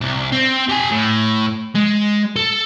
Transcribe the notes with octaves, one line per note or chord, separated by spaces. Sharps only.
C2
C4
G4 G#5
A2
G#3
A4